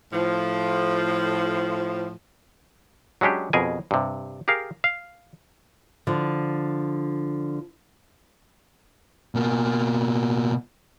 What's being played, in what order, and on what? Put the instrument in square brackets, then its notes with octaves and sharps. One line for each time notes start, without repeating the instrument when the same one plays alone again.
[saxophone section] A2 F3
[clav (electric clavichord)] F#3 G#3 C#4 D4 G4
F2 B2 G#4 A#4 G#5
G2 C3
G4 G#4 A#4 F5
F5
[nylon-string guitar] D3 F3
[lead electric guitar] B2 A#3